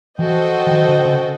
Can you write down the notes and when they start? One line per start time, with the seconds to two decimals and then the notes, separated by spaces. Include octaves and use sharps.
0.19 E3 F#4 A4 C5 D#5 G5
0.67 E3
0.71 D#3
0.88 D3
1.05 C#3